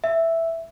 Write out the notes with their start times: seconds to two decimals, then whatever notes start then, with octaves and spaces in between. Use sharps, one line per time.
0.04 E5